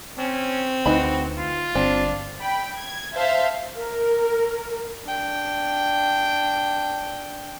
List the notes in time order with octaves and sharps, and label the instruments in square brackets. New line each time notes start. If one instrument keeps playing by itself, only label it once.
[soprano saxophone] C4 [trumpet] C#4
[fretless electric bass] D2 [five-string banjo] E3 D#4 B5 [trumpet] F#4
[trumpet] F4
[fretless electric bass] G1 [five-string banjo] C4 [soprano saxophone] D4
[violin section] G5 B5
G#6
C5 E5 F5 A5
[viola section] A#4
[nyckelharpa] D4 G5